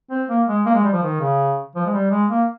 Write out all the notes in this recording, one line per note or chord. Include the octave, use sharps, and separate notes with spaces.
C4
A#3
G#3
A#3
G#3
G3
F3
D#3
C#3
F3
G#3
G3
G#3
A#3